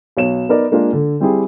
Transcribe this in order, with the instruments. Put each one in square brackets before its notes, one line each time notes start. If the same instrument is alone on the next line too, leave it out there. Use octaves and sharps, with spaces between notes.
[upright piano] B1 C#5 E7
B3 D#4 A#4 D5
G#3 A#3 D4 F4 A#4
D3
G3 C4 E4 G4 G#4